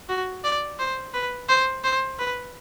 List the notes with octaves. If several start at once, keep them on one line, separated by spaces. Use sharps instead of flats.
F#4
D5
C5
B4
C5
C5
B4